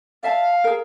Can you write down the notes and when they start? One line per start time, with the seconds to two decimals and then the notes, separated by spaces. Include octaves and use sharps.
0.23 D5 E5 F5 A5
0.64 G#4 A#4